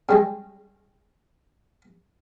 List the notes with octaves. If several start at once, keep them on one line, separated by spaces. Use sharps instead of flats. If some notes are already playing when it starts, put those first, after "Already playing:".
C#3 G3 G#3